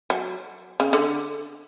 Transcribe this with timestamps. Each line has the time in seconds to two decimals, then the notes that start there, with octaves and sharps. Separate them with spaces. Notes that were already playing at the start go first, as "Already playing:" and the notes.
0.10 F#3
0.80 C#3
0.93 D3